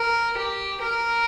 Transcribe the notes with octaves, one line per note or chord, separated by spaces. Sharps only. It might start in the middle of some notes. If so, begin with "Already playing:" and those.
Already playing: A#4
G4
A#4